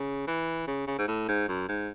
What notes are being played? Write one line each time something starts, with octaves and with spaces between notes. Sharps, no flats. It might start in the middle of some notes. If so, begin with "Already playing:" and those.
Already playing: C#3
E3
C#3
C#3
G#2
A2
G#2
F#2
G#2